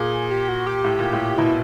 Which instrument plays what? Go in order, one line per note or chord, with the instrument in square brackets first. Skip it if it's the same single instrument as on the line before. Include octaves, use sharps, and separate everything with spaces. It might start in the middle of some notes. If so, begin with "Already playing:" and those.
Already playing: [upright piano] A#2 [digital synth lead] G#4
[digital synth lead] G4
F#4
G4
[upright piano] A2
A#2
A2
[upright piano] B2 [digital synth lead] E4